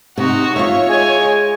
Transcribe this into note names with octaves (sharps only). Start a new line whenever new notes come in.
C3 D#4 F#4
F4 C#5 E5
G#3 G#5